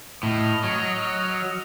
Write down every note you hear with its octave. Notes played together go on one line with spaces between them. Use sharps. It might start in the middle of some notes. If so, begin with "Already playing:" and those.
A2 D#5 F6
F#3